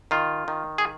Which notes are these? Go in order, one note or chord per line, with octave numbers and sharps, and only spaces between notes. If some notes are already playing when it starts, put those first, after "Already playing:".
D#3 F4
D#3
G#4